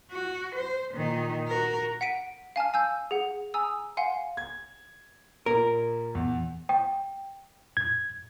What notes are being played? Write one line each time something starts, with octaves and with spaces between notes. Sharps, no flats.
F#4
C5
A#2 D#3
F#4 A#4
F#5 B6 D7 D#7
F5 G#5 A5 F6
G#5 E6 G6
G#4 F#5
G#5 A#5 D#6 E6
F5 F#5 G#5 C6
G#6
A#2 A#4
E2
G5
G#6